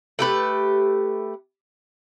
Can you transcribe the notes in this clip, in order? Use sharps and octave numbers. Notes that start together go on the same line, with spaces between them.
A3 G4 B4